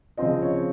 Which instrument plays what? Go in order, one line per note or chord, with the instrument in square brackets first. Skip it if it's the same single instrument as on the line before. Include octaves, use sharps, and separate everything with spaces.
[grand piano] C#3 F3 C4 F4 D#5
C#5